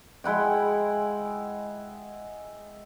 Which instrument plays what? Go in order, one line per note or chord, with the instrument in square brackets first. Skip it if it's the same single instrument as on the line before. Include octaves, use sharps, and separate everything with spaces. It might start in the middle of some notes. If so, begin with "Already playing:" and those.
[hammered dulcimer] G#3 E4 F#5 G5